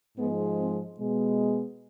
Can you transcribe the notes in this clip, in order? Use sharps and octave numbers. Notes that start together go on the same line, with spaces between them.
G#2 F3 G#3 B3
C4
B2 G#3 B3